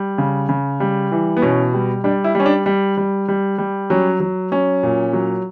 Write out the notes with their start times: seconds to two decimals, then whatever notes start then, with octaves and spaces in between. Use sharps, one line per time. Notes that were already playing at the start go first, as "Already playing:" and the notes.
Already playing: G3
0.18 C#3
0.49 C#3
0.80 G3
1.12 E3
1.37 B3
1.42 B2 C#4
1.73 G3
2.04 G3 D4
2.24 E4
2.35 G3 C#4
2.46 D4
2.66 G3
2.97 G3
3.28 G3
3.58 G3
3.90 F#3 C#4
4.20 F#3
4.52 F#3 C#4
4.83 A#2
5.13 F#3